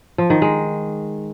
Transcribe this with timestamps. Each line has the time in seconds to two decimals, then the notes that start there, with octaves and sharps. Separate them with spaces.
0.18 F3
0.30 D#3
0.42 G#3